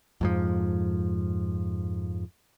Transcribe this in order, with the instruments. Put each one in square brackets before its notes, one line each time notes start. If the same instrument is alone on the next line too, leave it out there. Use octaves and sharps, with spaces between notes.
[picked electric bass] F2 G#2 F3